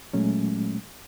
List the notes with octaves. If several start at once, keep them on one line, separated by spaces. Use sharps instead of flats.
A#2 F#3 G#3 A3 C#4